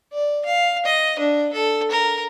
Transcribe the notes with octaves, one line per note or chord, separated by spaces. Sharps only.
D5
F5
D#5
D4
A4
A#4